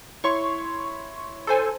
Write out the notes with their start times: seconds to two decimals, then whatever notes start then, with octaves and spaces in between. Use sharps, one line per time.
0.24 E4 C#5 C6 C#6
1.47 A4 C5 G#5